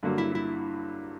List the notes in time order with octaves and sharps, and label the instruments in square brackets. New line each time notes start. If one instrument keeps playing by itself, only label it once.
[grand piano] G2 D3 F#3 A#3
[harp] E4
E4